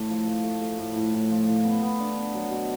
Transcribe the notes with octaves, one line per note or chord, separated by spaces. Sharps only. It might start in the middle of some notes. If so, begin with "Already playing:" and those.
Already playing: A2 A3
F3
A3
A3
A3
A2
A2
A2
F3
A2
B3
B3
D4
B3
F#3
B2